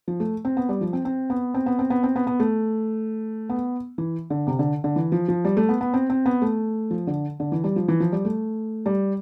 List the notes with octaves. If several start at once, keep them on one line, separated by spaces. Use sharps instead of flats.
F3
A3
C4
B3
G3
F3
C4
C4
B3
C4
B3
C4
B3
C4
B3
B3
A3
B3
E3
D3
C3
D3
D3
E3
F3
F3
G3
A3
B3
B3
C4
C4
B3
A3
F3
D3
D3
E3
G3
F3
E3
F3
G3
A3
G3